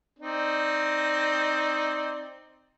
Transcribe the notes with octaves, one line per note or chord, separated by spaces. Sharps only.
C4 D#4 D5